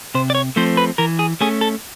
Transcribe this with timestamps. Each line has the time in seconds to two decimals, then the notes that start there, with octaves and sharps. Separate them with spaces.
0.15 C3 C5
0.30 D5
0.35 C#5
0.56 F3 A3 C4 C5
0.77 B4
0.98 E3 A#4
1.19 G#4
1.41 A3 C#4 G#4
1.61 A4